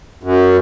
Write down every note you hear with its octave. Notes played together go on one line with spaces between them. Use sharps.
F#2